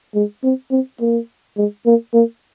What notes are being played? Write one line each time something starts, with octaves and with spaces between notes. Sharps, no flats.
G#3
C4
C4
A#3
G#3
A#3
A#3